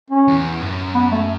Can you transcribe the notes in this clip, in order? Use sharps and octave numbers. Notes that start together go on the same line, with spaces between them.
C#4
E2
F#2
B3
A3